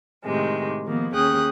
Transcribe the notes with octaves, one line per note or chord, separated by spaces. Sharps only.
A2 C3 D#3 G#3
D#3 F3 A#3 B3
D#2 C#4 G#4 G5 D#6 F#6